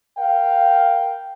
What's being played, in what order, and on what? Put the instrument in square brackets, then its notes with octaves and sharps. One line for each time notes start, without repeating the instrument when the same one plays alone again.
[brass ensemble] A#4 F5 G5